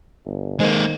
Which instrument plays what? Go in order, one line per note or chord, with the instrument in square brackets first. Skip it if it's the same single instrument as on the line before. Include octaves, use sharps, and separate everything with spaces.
[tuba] G1
[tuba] D#3 [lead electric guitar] G#3 A#3 [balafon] C5 D#5 G#5